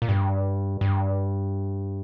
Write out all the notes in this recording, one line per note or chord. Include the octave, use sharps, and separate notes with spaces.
A#2
G2
G2